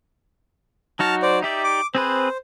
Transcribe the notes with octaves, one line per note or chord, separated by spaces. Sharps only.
F#3 D#4 F#4 A5 F6
C5 D5
D#4 G4 D5 E5
D6
C4 G#4 B4 C5